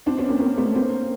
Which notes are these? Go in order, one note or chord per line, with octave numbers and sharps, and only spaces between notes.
C4 D4
B3 C#4
A#3 C4
A#3 C4
A3 B3
A#3 C4